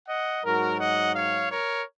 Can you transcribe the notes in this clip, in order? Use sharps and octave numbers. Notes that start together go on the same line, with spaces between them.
D#5 F#5
G#2 F#3 F#4 A#4
D#5 F#5
C#5 F5
A#4 C#5